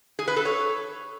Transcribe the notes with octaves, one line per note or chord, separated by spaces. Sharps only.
G#4
B4
A4
C#5